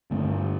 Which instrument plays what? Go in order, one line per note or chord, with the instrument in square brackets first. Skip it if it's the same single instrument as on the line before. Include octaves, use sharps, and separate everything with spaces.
[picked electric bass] G2 D3 A3